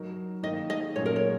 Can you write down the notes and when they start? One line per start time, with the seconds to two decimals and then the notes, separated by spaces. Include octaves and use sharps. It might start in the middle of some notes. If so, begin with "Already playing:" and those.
Already playing: F#3 D#4 A#4
0.43 D#3 A#3 D#4 D#5
0.70 D#5
0.96 A#2 F#3 C#4 G#4 C#5
1.06 A#4
1.16 C#5